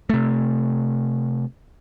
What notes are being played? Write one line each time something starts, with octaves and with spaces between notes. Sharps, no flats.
C3 A3